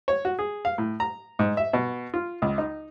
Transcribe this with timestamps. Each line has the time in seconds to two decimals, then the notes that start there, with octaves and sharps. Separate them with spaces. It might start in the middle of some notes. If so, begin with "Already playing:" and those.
0.08 C#5
0.25 F#4
0.39 G#4
0.65 F5
0.78 A2
1.00 A#5
1.39 G#2
1.57 E5
1.73 B2
2.14 F4
2.42 C#2
2.58 D#4